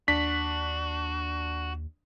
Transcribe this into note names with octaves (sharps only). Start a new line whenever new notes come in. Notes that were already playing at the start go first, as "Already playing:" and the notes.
D#2 D4 F#4 B6